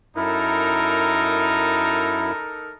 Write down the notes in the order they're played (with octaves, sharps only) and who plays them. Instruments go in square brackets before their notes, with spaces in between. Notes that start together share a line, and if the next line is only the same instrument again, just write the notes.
[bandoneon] F#2 E4 [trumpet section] D#4 A4 A#4